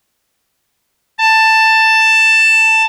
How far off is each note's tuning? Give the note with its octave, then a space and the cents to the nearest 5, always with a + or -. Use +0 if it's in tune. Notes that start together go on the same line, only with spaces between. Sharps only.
A5 +10